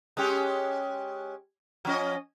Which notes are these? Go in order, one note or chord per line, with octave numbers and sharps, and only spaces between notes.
G#3 C#4 G4
F3 C#4 D#5